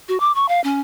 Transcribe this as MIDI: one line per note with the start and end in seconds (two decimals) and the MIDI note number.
0.08 0.18 66
0.20 0.32 86
0.35 0.48 85
0.48 0.62 77
0.64 0.81 61